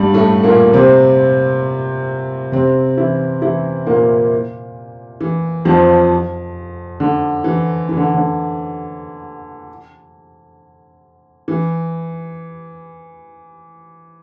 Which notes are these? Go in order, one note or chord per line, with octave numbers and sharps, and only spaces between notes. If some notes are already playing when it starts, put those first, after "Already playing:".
Already playing: G2 G3
A2 A3
A#2 A#3
C3 C4
C3 C4
E3 E4
E3 E4
A#2 A#3
E3
F2 F3
D3
E3
E3
D3
D3
E3